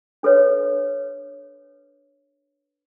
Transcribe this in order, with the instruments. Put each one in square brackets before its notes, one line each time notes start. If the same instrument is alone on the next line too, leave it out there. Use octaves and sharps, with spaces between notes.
[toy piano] D4 A4 B4 C#5